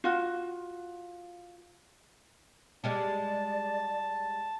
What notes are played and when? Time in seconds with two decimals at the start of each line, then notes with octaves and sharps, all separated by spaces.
0.04 F4 F#4
2.84 G3 G#3 G4 D5 A5